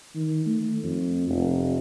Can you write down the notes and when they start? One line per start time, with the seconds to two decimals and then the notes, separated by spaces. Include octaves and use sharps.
0.15 D#3
0.46 A3
0.83 F2
1.30 F1